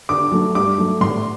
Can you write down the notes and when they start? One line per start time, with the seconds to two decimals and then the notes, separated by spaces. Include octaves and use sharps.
0.09 D3 D6
0.31 F#3 A3
0.55 G2 D6
0.78 F#3 A3
1.01 A2 C6